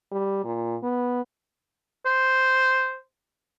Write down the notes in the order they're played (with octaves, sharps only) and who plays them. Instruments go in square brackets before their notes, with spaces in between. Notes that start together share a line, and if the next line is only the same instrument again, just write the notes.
[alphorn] G3
A#2
B3
[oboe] C5